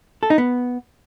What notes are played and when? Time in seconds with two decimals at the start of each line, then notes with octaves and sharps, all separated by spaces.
0.23 A4
0.30 D#4
0.38 B3